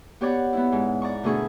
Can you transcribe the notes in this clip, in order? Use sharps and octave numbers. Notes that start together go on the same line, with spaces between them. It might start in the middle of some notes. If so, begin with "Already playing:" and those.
B3 G4 C#5 D5 F#5
B3 E4
G#2
D5 A#5 C#6
B2 D3 A3 G#4 C#6